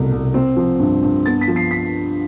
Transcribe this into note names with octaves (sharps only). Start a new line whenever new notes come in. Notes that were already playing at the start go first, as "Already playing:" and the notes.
Already playing: C2 B2 A3
C2
C4
F3
G2
G2
B3 A6
B6
F3
C7
B6